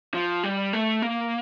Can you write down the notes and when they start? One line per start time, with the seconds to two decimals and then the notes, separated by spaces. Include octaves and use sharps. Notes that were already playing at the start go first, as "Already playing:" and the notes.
0.14 F3
0.43 G3
0.73 A3
1.02 A#3